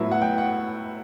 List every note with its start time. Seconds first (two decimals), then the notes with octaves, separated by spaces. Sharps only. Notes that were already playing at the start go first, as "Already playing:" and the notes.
Already playing: A2 F#3 B3 E4
0.12 F#5
0.22 G5
0.38 F#5